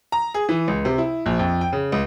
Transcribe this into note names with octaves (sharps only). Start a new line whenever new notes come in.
A#5
G#4
E3
C#2
C3
E4
A#1
F2
G5
C#3
C#2